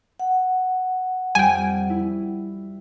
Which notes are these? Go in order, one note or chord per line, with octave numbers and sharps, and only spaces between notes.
F#5
F2 G3 G5 G#5
E4